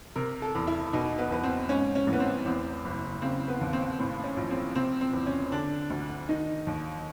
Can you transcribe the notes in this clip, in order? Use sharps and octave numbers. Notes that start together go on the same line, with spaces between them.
C3 A#4
A4
E2
E4
B2 D#4
B3
E2 B3
C4
G#2 C#4
C#4
A1
B3
C4
E2 C4
F#1
C#3 C4
B3
D#2
C4
A2 C4
C#4
A#1
C4
C3 C4
C4
E2
C#4
D3 D4
D2
D#3 D#4
D#2